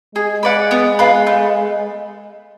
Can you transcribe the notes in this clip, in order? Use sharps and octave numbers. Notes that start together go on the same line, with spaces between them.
G#3 G#4
B4 D5 F#5
B3
F4 B4
A3